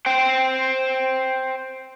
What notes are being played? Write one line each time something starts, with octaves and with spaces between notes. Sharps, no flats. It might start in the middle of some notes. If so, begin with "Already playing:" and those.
C5 G5